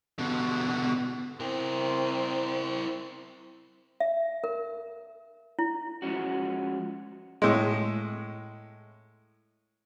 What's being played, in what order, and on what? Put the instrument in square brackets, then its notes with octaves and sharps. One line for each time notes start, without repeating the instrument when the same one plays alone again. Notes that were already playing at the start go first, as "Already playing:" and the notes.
[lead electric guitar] B2 D3
[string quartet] C4 [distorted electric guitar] E4 A#4
[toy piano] E5
A#4
E4
[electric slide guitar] F3 G#3 A3 C#4 F#4
[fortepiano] A2 G#3